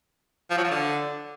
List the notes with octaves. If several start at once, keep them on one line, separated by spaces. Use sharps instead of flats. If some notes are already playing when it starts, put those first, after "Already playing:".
F3
F#3
F3
D3